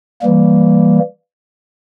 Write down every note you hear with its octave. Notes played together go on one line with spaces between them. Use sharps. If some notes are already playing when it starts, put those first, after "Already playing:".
E3 G3 A#3